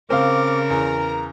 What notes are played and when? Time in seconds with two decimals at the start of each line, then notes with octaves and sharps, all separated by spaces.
0.10 C#3 C4 A#4 F5 D6
0.70 E2 A#5